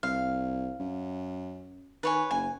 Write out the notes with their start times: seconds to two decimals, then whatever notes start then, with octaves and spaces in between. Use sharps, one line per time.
0.03 C2 F5
0.80 F#2
2.03 D#3 B4 C#5 G#5
2.31 F#1 G#5